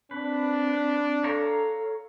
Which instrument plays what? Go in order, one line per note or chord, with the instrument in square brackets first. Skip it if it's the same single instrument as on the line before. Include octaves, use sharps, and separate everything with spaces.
[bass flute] C4 [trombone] D4 [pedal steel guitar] B4
[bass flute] A4 [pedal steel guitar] C#5 F5 A#5